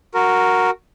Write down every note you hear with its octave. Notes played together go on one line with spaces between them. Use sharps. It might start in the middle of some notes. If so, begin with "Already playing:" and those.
F#4 A#4